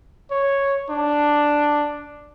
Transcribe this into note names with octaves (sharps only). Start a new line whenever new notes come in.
C#5
D4